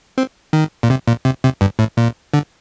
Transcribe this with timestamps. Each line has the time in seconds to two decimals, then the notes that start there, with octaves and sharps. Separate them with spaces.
0.18 C4
0.53 D#3
0.83 A#2
0.90 C3
1.08 A#2
1.25 C3
1.43 C3
1.61 G2
1.79 A2
1.97 A#2
2.34 D3